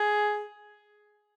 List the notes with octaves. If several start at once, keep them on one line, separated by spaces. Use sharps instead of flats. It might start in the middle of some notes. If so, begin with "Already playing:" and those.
Already playing: G#4